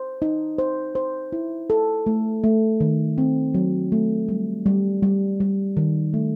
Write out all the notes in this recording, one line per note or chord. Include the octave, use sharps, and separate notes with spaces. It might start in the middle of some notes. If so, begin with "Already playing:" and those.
Already playing: C5
D#4
C5
C5
E4
A4
A3
A3
D#3
C4
F#3
A3
G3
G3
G3
G3
D#3
A3